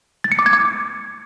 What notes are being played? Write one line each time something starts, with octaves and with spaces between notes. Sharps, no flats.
A6
C#7
D6
G#6
D6